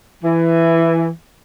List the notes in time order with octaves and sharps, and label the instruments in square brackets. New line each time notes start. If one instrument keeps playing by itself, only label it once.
[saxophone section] E3